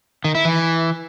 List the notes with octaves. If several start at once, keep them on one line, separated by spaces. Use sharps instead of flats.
D#3
E4
E3